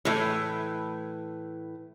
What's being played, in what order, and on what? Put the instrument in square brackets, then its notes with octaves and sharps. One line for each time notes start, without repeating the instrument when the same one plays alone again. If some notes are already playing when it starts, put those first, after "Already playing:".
[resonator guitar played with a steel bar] A2 E3 [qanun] A3 C#5